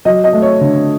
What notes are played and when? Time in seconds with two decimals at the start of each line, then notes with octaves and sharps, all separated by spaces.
0.05 F#3 D#5
0.24 D#5
0.33 A3
0.42 C#5
0.61 D3